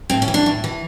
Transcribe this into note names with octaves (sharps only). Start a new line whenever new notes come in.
A2 C4
C#4
E3
D4
A2
E3